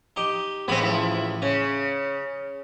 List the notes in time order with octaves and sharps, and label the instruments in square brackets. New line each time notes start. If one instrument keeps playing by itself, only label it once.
[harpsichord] D#4 G4
[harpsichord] A1 C#3 B5 [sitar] B3 C4
[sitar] F3 E4
[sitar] C#3 [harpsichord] C#4